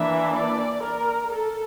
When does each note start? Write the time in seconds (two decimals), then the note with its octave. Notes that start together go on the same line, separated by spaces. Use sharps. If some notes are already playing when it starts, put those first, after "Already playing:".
Already playing: E3 A#3 D4 E5
0.33 D5
0.84 A#4
1.33 A4